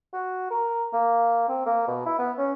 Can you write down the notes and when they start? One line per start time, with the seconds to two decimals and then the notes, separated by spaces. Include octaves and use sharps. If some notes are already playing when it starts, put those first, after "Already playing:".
0.13 F#4
0.51 A#4
0.93 A#3
1.49 C4
1.66 A#3
1.88 B2
2.06 E4
2.19 B3
2.38 C#4